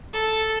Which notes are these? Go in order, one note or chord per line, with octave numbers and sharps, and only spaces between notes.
A4